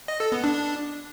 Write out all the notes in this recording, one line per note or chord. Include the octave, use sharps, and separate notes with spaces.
D#5
A4
B3
D4